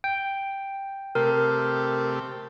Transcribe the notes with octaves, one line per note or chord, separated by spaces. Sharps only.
G5
C3 A3 G4 A#4